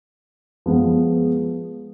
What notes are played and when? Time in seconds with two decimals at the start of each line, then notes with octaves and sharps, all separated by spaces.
0.66 F3 G#3 B3 F4